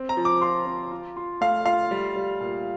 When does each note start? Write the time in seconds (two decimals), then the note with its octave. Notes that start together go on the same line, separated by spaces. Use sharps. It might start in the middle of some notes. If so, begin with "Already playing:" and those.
Already playing: C4
0.09 A#5
0.17 F3
0.25 D6
0.42 F4 C6
0.66 C4
0.91 F4
1.16 F4
1.41 A3 F5
1.66 F4 F5
1.91 G3
2.16 G3
2.40 A#2